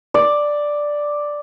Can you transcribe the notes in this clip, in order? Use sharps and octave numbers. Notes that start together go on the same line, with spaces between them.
D5